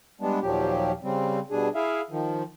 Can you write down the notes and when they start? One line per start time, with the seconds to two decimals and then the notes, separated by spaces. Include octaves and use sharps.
0.21 G3 G#3 B3 D4
0.42 D#2 A#2 F3 F#3 G4
1.03 C#3 G3 C4
1.51 B2 G3 D4 G#4
1.75 E4 G#4 E5 F5
2.10 D#3 F3